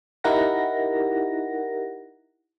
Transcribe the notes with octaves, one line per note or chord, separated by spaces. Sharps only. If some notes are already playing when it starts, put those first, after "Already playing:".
D#4 E4 G4 A#4 F#5 A#6